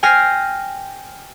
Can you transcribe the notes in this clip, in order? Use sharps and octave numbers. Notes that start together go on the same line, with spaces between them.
G5 G#5 F6 A#6 C7